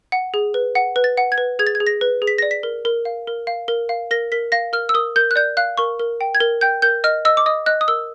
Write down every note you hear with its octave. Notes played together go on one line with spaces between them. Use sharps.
F#5
G#4
B4
F#5
B4
A6
F#5
G#6
B4
G#4 G#6
A6
G#6
G#4
A#6
B4
G#4
B6
D5 A#6
B6
A#4
A#4
F5
A#4
F5
A#4
F5
A#4 A#6
A#4 B6
F5 A#6
A#4 F6
E6
A#4 D#6
A#4 G6
F#6
D5 G6
F5 F#6
A#4 C#6
A#4
G5
G#6
A#4
G5 G6
A#4 G6
D#5 F6
D#5 E6
D6
D#5 D#6
D#5 F#6
D#6
A#4 E6